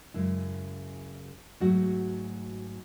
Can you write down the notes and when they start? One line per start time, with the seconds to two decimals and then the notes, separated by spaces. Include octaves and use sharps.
0.14 F#2 C#3 G#3 E4
1.60 G#2 F#3 A3 F#4